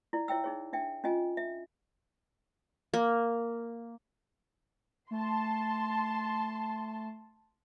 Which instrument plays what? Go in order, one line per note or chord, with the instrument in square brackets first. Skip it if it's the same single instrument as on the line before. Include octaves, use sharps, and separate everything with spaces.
[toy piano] E4 D5
E4 C#5 E5 G5 E6
D#4 G#4 C#5
D4 E5 G5
C#4 F4 D#5 G#5
E5
[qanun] A#3
[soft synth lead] A3 [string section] A5 C6